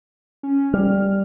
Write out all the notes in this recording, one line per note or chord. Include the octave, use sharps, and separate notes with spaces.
C#4
G3 F6